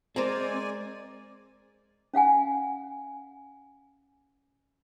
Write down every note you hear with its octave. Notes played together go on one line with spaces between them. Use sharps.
G#3 C4 A#4 C5 D5 G#5
C#4 F5 F#5 G#5